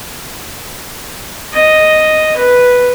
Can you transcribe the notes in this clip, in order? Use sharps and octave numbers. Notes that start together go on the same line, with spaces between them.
D#5
B4